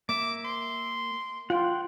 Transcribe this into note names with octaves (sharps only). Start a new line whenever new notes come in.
A#3 E5 D6
C6
F4 F#5 G5